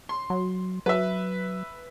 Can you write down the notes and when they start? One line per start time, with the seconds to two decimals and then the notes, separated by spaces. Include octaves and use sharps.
0.09 C6
0.30 F#3
0.86 F#3 B4 E5